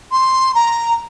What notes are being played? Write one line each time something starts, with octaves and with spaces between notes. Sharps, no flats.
C6
A#5